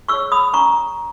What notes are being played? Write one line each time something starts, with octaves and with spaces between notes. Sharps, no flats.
G#4 C#5 C#6 E6
B5 D#6
C#4 A#5 C#6